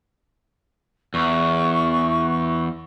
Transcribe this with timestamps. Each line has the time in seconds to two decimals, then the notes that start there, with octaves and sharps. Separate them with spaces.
1.14 E2 C#6